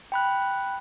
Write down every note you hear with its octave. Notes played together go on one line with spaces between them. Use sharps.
G5 B5 F#6